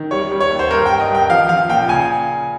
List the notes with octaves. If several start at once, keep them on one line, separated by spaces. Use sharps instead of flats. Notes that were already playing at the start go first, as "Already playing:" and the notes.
Already playing: D#3
G3 C#5
G3
C#5
D#2
C5
G2 A#4
G2 G5
D#5
G2
G5
F3 F5
F3 F5
A#2 G5
C#3 G#5